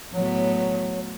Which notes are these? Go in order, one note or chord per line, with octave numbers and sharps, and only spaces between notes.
A2 F#3 A3 B3 C#5